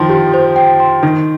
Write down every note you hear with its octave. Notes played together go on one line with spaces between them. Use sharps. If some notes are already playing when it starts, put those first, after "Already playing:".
Already playing: D#3 F3 G5 C6
G4
C5
G5
C6
D#3 D#4